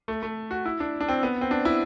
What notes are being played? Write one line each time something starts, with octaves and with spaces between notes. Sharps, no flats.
A3
A3
F#4
E4
D4
D4
C4
B3
C4
D4
E4